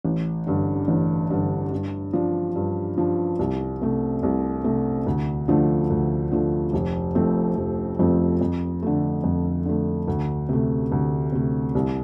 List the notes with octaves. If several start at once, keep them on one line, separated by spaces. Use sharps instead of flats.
A1
G2 D3
A1
G2 D3
G2
F3 D4
G2
F3 D4
C2
C3 A3
C2
C3 A3
D2
D3 F3 A3
D2
D3 F3 A3
F1
F2 F3 A3 C4
F1
F2 F3 A3 C4
F2
D3 A3
F2
D3 A3
D2
C3 A3
D2
C3 A3
C2